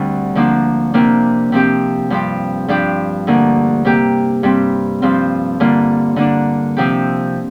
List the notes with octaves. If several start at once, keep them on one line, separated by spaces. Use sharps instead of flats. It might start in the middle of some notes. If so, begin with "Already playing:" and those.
Already playing: D2 D3 G3 C4
D3 F3 A#3 D4
C3 A#3 D4 F4
C3 F3 C4 G4
G2 F3 C4 G4
G2 F3 D4 G4
D2 D3 A#3
C3 A#3 G4
G2 G3 C4
G2 F3 C4 F4
G2 D3 A#3 F4
D3 A#3 D4
C3 F3 C4 G4